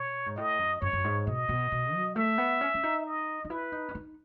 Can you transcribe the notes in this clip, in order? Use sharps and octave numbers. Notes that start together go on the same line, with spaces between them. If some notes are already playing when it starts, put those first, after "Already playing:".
Already playing: B2 C#5
G#2
A2 D#5
F#2
F#2 C#5
F#2
G#2
B2 D#5
B2
B2
F#3
A3 E5
B3
C#4
C#4
D#4
D#5
D#4
E4 B4
D#4
C#4
D#4